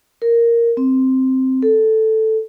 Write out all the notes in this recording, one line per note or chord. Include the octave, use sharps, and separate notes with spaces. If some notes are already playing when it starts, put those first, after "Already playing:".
A#4
C4
A4